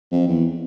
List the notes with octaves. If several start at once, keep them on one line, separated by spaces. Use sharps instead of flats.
F2
E2